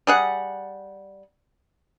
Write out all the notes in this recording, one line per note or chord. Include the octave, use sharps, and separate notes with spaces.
G3 G#4 F#5